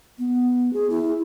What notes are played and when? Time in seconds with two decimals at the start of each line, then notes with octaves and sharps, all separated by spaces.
0.19 B3
0.73 G#4
0.90 E4